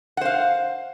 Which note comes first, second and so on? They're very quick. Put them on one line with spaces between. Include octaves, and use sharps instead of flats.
F#5 C5 F5